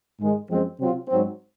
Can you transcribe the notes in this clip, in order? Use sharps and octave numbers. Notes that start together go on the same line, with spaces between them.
G#2 D#3 G#3
F#2 F3 G#3 C4
C3 F#3 C4 F4
G#2 F#3 C4